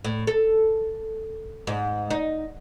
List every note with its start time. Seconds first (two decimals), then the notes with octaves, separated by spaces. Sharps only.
0.04 A2
0.27 A4
1.67 G#2
2.10 D#4